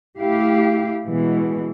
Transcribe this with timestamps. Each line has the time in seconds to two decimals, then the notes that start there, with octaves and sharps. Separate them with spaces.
0.18 A3 E4 G4 F5
1.05 B2 E3 G#3